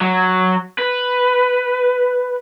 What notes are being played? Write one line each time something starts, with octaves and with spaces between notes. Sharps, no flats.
F#3
B4